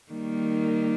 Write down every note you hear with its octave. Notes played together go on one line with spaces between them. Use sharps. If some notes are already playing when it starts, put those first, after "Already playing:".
D#3 G3 A#3